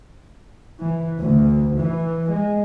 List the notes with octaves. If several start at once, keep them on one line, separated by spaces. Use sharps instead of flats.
E3
D2
E3
G#3